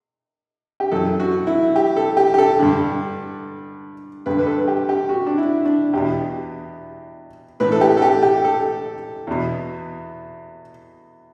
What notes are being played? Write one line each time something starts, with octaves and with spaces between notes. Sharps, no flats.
G4
F#2 E3 A4
F#4
E4
G4
A4
G4
G4
A4
G2 D3
G2 D3 B4
B4
A4
G4
G4
F#4
D4
E4
D4
E2 B2 G4
A2 E3 B4
A4
G4
A4
G4
G4
A4
E2 B2